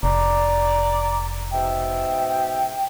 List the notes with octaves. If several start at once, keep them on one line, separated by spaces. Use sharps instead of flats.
F1 D5 A#5
G#2 B2 E5 G5